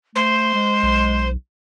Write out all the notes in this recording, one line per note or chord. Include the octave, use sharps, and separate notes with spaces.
A3 C5
G#3
B1